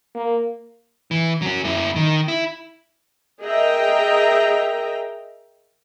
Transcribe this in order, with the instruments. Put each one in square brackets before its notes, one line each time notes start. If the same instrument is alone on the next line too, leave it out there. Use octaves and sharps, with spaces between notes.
[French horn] A#3
[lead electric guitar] E3
F#3 C#4
F#2 E4
D#3
E4
[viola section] G#4 A#4 D#5 E5 G5 A#5